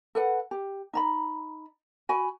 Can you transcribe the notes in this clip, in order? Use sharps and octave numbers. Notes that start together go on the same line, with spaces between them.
A4 B4 F#5
G4
D#4 A#5 B5
F#4 G#5 B5